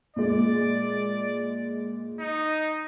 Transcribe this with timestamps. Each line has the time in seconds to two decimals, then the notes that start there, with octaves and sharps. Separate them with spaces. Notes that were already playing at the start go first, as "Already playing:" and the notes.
0.16 A#2 G#3 D5
2.19 D#4